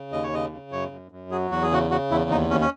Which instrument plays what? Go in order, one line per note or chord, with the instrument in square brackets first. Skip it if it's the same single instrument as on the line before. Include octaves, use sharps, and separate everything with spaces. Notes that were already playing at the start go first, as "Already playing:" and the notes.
Already playing: [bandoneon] C#3
D#2 D#5
C#5
C#3 D#5
C#3
F#2 C#5
F#2
F#2
F#3 G#4
E2 F#4
G#4
C#3 F#4
C#3 F#4
E2 E4
D#2 D#4
D#2 C#4
C#4